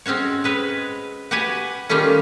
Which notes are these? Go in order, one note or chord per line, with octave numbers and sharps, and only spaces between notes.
G#3 C4 C#4 F#4 C#5
G#3 B4 C#5
F#4 G4 B4 F#5 G#5
D#3 G3 A3 A#3 C#4 F4